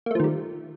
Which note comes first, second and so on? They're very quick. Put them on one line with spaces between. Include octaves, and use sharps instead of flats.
A#3 A3 F3 D#3 G3